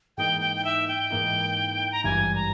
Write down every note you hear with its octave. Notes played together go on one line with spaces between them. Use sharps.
G#2 E3 A#3 D#4 G5
G5
G5
E5
G5
G#2 E3 A#3 D#4
A#5
G#1 G2 E3 G3 G#5
A#5